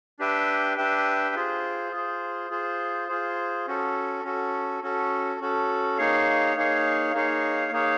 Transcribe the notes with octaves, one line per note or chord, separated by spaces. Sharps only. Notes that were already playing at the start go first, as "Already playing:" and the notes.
D4 G4 B4 E5 G5
D4 G4 B4 E5 G5
F4 G#4 C5
F4 G#4 C5
F4 G#4 C5
F4 G#4 C5
C#4 F#4 A4
C#4 F#4 A4
C#4 F#4 A4
C#4 F#4 A4
A#3 D#4 G#4 C#5 F5
A#3 D#4 G#4 C#5 F5
A#3 D#4 G#4 C#5 F5
A#3 D#4 G#4 C#5 F5